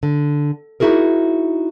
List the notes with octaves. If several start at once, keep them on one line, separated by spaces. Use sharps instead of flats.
D3
D#4 E4 F#4 G#4 A#4